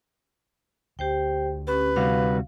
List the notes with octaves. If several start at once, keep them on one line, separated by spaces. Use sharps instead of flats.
D2 G4 C5 G5
C#4 G4 B4
C3 G3 F#4 F5